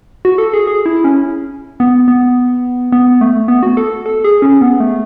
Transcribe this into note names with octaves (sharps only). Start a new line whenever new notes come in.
F#4
A4
G#4
G#4
E4
C#4
B3
B3
B3
A3
B3
F#4
A4
A4
G#4
C#4
B3
A3